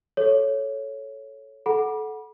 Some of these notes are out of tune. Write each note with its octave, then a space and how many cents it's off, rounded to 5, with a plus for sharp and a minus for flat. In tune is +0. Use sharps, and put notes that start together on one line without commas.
A4 -15 C#5 +0
A4 -25 F#5 +0 B5 -35